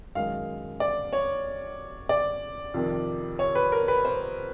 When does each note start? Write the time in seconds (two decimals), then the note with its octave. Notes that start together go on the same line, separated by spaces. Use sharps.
0.15 F#2 D#3 G#3 F5
0.80 D5
1.13 C#5
2.09 D5
2.74 F2 C3 D#3
3.39 C#5
3.55 B4
3.72 A#4
3.88 B4
4.05 C5